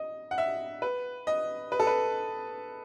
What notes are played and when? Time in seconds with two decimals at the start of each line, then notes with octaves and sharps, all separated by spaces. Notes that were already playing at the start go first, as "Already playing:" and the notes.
Already playing: D#5
0.31 F#5
0.38 E5
0.82 B4
1.27 D#5
1.72 B4
1.80 A4
1.87 B4